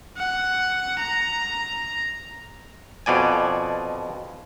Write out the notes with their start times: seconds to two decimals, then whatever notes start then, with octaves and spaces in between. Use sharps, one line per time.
0.17 F#5
0.99 A#5
3.06 F2 B2 D5 G#5